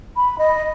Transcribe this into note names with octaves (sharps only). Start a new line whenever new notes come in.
B5
D#5